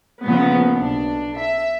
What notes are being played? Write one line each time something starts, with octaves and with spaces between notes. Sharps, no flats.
A#2 C#3 F3 B3
B1 D4
E5